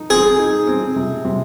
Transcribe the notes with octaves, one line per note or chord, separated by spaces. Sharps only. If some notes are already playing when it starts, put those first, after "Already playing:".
Already playing: D#4
C4 G#4
D#4
C4
C3
C3